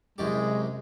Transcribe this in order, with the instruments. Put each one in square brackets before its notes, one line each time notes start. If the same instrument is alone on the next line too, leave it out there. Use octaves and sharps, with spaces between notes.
[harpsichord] C2 F#2 G4 [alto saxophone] G#3